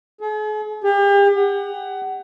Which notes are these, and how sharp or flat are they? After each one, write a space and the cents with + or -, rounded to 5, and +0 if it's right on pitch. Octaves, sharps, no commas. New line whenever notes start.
G#4 +45
G4 +40
F#5 +25